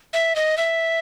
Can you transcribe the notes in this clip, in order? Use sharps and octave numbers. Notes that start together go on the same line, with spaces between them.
E5
D#5
E5